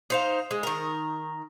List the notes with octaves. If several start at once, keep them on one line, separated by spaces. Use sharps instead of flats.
D#4 C5 F5
G#3
D#3 A#4